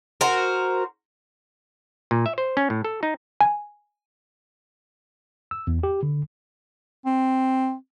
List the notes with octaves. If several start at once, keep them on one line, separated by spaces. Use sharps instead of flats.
F#4 A#4 C5
A#2
E5
C5
C#4
A2
A4
D#4
G#5
E6
E2
G4
D3
C4